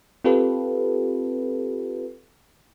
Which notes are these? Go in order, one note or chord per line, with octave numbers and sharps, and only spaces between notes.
C4 F4 G4 A4 B4